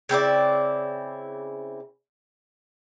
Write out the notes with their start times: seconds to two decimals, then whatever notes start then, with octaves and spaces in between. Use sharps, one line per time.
0.09 C#3 C4 E4 D5